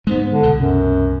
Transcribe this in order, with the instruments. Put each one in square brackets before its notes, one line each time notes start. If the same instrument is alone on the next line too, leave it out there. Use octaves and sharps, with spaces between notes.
[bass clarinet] G#2 [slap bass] G#3 A3 B3
[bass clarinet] D3
[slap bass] C2 B2
[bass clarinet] F#2